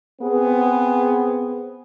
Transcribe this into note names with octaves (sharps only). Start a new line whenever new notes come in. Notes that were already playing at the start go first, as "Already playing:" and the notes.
B3 C4 G#4